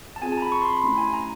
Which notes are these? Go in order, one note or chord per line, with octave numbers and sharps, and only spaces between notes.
A5
C4 F4 G#4 G#5
A5
A#5
B5
C#6
C6
B5
A3 C#4 E4 G4 C6
G#5
A#5